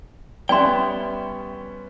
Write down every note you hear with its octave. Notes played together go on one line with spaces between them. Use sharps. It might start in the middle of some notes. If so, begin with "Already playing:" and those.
G3 B3 C#4 D5 E5 G5 G#5 C6